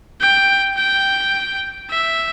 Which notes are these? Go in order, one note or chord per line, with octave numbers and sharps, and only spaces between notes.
G5
G5
E5